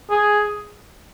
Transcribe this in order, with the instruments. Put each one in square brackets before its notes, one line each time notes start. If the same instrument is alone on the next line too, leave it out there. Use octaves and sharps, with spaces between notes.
[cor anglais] G#4